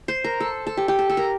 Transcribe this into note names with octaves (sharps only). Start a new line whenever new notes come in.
C5
A#4
A4
A4
G4
G4
A4
A4
A#4